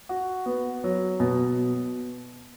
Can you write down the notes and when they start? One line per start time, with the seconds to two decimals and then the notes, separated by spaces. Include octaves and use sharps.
0.09 F#4
0.46 B3
0.84 F#3
1.20 B2